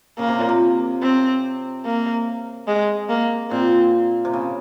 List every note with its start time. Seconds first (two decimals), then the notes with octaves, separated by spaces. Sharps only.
0.18 C#3 A#3
0.28 C3
0.39 A#2
0.49 C3
1.02 C4
1.85 A#3
2.67 G#3
3.09 A#3
3.51 A#2 C4
4.25 C3
4.34 C#3